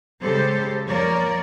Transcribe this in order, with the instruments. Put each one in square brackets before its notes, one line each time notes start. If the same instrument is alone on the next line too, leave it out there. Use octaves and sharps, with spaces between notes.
[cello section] C#3 G#3 G4 A4 C5
F3 A#3 A#4 C#5 D5